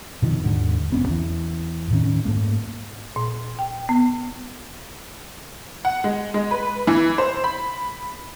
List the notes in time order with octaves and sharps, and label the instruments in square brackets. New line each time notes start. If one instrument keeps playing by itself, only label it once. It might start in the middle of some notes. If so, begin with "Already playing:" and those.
[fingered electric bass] B2 D#3 F3
D#2 G#2 D3
F1 B3 C#4
E2 E3
A2 D#3 C#4
G#2 A3 A#3
[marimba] A#2
G5
B3
[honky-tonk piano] F#5
G#3
G#3
B4
E3
C5
B5